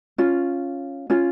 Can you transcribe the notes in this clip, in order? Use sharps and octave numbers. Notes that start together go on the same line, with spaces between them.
C#4 F4
C#4 F4